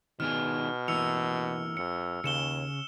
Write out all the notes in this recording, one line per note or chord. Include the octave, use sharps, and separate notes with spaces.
B2 D#3 B3 G#4 F6
E3 A#3 E6 C#7 F7
F2 C#7
D#2 C#3 C#7 E7 G7